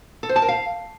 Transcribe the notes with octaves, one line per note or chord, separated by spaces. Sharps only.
A4
C5
A5
A#4
F5